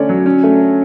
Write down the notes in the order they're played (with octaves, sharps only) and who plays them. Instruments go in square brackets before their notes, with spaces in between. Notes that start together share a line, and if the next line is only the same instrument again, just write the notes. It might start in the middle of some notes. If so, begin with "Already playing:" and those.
Already playing: [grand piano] D3 A3 C#4 C#5 D5
F#3
C#4
A3